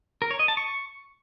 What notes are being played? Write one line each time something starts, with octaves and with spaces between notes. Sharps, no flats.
A#4
C#5
D#5
A5
C#6